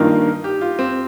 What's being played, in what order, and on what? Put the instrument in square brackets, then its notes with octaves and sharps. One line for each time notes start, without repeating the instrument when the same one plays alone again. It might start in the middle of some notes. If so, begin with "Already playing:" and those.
Already playing: [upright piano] G2 D#3 A#3 F4 A#4 [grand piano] D#4
[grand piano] G4
F4
C4